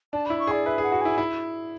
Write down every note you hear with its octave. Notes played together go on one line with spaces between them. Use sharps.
D4 A5
E4 B5
C#6
G#4 D5
B4 E5
G#4
F#5
F#4
E4 G#5
E4